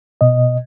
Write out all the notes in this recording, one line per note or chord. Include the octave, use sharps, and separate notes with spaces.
B2 D#5